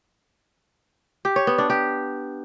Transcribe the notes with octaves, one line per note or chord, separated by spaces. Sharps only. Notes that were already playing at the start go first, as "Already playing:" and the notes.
G4
C#5
B3
D4
G4